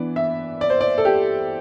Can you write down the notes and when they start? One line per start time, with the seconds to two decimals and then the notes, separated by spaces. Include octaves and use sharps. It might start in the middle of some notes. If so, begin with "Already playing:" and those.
Already playing: E3 B3 D4 D5
0.16 E5
0.61 D5
0.70 C5
0.81 D5
0.98 A4
1.05 G4